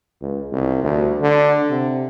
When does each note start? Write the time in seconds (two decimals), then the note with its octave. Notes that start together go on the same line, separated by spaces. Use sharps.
0.21 C#2
0.52 C2
0.83 D2
1.21 D3
1.70 C3